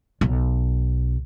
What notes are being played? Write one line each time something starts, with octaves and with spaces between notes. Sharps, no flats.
B1